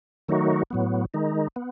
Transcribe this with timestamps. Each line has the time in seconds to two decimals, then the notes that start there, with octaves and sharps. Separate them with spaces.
0.29 D#3 F#3 A3 D#4 F#4
0.71 A2 F#3 B3
1.14 D#3 G#3 D#4
1.56 B3